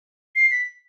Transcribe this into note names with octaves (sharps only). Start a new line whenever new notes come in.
C7
B6